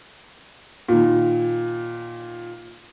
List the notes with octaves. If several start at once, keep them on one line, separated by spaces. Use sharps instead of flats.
A#2 D#3